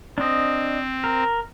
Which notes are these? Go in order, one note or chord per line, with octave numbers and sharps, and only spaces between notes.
C4 D4 D#5
A#4